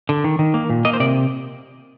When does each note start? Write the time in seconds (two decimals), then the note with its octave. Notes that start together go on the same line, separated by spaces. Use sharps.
0.09 D3
0.24 D#3
0.39 D#3
0.54 A#3
0.70 A#2
0.85 A#3 D#5
0.93 C5
1.00 C3 D5